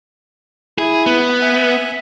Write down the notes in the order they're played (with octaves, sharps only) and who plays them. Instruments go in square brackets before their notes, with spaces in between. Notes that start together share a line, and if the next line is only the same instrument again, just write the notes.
[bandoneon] E4 [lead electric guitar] G#4
[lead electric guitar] B3
[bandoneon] E5 G#5